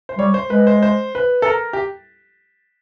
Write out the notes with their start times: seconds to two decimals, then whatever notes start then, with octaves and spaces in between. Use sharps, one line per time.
0.09 C5
0.18 G3 C#5
0.34 C5
0.50 G#3 B4
0.67 C5
0.82 C5
1.15 B4
1.42 A4
1.46 A#4
1.73 G4